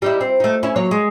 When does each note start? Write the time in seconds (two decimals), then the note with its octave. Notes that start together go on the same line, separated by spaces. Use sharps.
0.02 G3 D#4 E4
0.21 C4
0.40 A3 D#4
0.63 C#4 E4
0.76 F#3 A#3 C#5
0.91 G#3